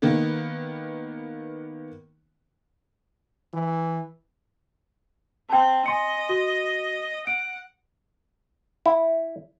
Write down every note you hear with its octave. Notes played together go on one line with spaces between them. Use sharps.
D#3 A#3 B3
E3
C4 G5 A5
D#5 G#5 C6 C#7
F#4
F#5 D7
E4